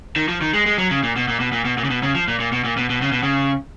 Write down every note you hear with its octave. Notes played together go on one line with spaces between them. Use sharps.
D#3
F3
D#3
G#3
G#3
F#3
C#3
A#2
B2
A#2
B2
A#2
B2
A#2
C#3
B2
C#3
F3
A#2
A#2
B2
A#2
B2
B2
C#3
B2
C#3